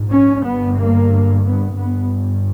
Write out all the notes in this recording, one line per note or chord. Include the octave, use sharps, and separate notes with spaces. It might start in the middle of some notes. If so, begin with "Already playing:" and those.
Already playing: A#1 G#2
C#4
G1 G2 B3
A#3
B3
G1 G2 B3